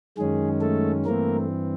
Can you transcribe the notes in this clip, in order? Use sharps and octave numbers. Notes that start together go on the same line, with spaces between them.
F#2 D#3 G#3 C#4 G#4
A3 A4
G2 E3 A3 A#3 C4 A#4